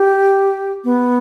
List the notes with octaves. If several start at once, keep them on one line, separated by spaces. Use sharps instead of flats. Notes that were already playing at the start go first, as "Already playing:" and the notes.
Already playing: G4
B3